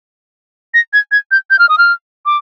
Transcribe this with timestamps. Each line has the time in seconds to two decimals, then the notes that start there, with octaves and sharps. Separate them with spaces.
0.74 A#6
0.93 G#6
1.12 G#6
1.31 G6
1.50 G6
1.59 F6
1.69 D#6
1.78 F6
2.26 D6